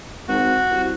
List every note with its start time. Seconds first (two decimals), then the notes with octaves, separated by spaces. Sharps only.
0.28 G#1 F#4
0.71 C2